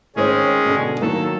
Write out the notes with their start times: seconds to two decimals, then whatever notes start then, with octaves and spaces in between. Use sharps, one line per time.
0.16 D#3 G#3 C4 C#4 G#4 C#5
0.65 B2 D3
1.01 D#3 F#3 A#3 A4